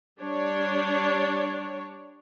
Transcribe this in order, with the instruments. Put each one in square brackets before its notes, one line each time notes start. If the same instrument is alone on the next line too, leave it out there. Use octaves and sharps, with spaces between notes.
[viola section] G3 D4 C#5